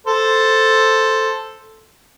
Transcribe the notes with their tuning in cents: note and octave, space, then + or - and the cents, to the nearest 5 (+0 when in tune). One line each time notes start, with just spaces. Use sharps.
A4 +0 C5 +0